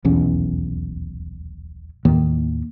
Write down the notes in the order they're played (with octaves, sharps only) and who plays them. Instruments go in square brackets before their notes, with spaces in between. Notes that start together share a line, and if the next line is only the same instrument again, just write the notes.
[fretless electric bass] D#1 B1 E2 C#4
D#2 A2 D#3 A#3